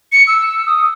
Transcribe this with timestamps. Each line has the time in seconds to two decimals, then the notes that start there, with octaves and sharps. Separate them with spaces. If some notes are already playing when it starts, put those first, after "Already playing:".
0.12 C#7
0.27 E6
0.67 D#6